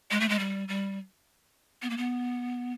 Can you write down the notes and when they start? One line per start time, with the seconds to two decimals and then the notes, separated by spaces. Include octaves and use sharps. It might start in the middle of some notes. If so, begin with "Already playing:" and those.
0.11 G#3
0.20 A3
0.29 G#3
0.39 G3
0.68 G3
1.82 B3
1.90 A#3
1.97 B3